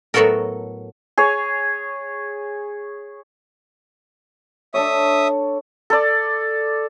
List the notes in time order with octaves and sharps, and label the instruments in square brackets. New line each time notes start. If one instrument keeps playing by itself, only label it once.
[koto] A2 F#3 B3 F#4 A4 A#4
[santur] G#4 C#5
[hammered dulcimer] D4 A4 C#5 [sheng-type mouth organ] E5 D#6
[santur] A4 D5